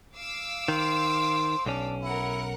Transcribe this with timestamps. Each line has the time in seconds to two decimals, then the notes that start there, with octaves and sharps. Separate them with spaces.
0.16 F5 D6 E6
0.68 D#3 C5
1.66 B1 C#4 D4
2.03 E4 A#4 F#5